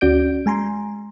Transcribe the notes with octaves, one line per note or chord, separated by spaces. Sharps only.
D2 C#4 F#4 D5 G6 D7
G#3 G#5 A#5 C6